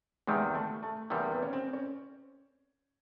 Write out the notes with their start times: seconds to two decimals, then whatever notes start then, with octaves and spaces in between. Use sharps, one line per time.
0.27 E2 C3 D#3 G3 G#3
0.55 A3
0.83 A3
1.10 E2 C3 D#3 G3 A#3
1.31 B3
1.42 C#4
1.53 C4
1.73 C#4